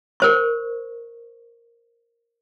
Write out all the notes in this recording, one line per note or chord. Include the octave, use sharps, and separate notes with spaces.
A#4 C5 C#6